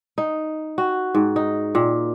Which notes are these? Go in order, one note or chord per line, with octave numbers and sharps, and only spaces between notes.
D#4
F#4
G#2
D#4
A#2